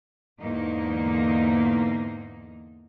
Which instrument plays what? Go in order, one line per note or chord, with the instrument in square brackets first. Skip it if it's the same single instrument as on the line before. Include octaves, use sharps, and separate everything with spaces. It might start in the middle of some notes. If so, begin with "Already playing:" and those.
[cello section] E2 G#2 D3 A#3 D#4